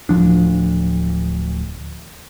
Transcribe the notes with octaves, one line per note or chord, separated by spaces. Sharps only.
D1 D2 F3 D4